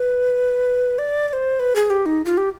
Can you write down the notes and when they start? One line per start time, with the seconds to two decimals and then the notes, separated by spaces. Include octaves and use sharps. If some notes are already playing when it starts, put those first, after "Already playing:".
Already playing: B4
0.98 D5
1.28 D5
1.33 C5
1.60 B4
1.76 G#4
1.90 G4
2.06 D#4
2.25 F4
2.37 G4